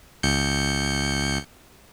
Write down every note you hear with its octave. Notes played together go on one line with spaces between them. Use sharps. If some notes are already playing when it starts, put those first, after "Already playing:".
C#2 G6 C#7